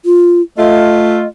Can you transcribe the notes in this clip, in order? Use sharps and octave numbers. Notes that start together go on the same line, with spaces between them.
F4
A3 F4 D#5